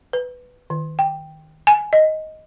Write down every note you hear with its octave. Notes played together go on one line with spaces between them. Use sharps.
B4
D#3
G5
G#5
D#5